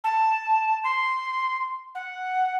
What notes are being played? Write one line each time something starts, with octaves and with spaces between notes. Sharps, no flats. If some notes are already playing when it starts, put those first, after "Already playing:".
A5
C6
F#5